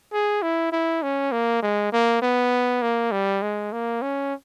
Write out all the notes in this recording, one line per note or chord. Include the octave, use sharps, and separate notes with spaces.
G#4
E4
E4
C#4
A#3
G#3
A#3
B3
A#3
G3
G#3
A#3
C#4